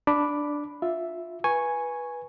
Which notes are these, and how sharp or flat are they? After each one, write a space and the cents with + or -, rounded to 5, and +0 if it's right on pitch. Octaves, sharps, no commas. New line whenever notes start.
D4 +0 B5 +0 D6 +0
F4 +15 E5 +0
B4 -15 G#5 +0 C#6 -5